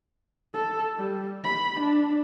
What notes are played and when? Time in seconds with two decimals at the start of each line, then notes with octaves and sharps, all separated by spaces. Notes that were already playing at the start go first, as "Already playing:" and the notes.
0.54 A4
0.97 G3
1.44 B5
1.80 D4